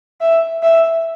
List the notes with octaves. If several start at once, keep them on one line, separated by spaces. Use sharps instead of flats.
E5
E5